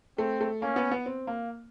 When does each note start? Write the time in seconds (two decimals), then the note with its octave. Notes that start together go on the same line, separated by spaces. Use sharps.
0.18 A3 C4
0.41 A3
0.62 A#3 C#4
0.76 B3
0.91 B3
1.06 C4
1.27 A#3